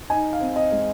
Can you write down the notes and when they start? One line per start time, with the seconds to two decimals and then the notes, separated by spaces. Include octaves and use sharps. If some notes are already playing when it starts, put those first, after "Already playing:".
0.10 D#4 G#5
0.33 F5
0.41 C4
0.56 D#5
0.72 G#3